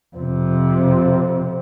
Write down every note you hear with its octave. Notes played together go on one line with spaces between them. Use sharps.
F2 C3